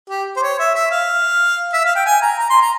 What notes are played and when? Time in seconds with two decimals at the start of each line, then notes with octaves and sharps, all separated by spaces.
0.09 G4
0.36 C5
0.42 C#5
0.59 E5
0.75 E5
0.91 F5
1.73 E5
1.85 F5
1.95 G5
2.06 G#5
2.22 A#5
2.39 A#5
2.50 C6
2.61 A#5